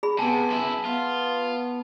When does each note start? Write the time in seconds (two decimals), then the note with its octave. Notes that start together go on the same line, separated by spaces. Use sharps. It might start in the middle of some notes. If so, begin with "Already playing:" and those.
0.03 G#4 B5
0.19 C3 B3 G#5 A5
0.50 F#2 E4
0.85 B3 F4